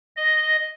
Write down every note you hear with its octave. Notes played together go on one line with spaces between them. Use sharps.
D#5